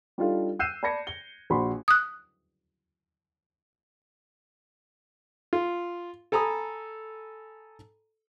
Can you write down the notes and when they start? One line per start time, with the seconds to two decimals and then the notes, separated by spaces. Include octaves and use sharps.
0.18 G3 D4 D#4 F4 A4 F5
0.59 E6 F#6 G6 C7 D#7 E7
0.83 D5 A5 B5 G#6 A#6 C#7
1.07 G7
1.50 A#1 F#4 D5 B5 C6
1.88 D#6 F#6
5.53 F4
6.32 A4 G#5 A#5 B5 D#6